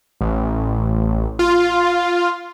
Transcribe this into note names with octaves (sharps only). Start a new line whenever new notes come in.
A1
F4